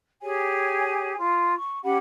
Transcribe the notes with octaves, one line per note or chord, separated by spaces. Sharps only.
G4 G#4 C#5 G#5
F4
C#6
C#4 G4 F#5 B5